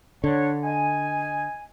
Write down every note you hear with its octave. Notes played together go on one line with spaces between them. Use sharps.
D3 D4 C#5
D#5 G#5